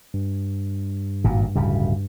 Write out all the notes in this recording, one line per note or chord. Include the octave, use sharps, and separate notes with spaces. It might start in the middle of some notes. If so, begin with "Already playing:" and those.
G2
G#1 A#2
D1 C#3 G3